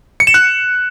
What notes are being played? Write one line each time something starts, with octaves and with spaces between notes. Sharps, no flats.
C#7
E7
F#6